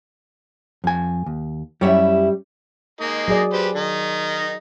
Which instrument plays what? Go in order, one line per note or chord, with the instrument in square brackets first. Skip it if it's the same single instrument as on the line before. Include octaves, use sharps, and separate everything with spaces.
[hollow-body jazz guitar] F2 G#5
D#2
[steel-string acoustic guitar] F#2 E4 E5 [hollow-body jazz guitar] G3 G4 C#5
[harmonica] G#3 A#3 D#4
[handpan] F#3 G#4 D5
[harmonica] G4 B4 C5
D#3 D#4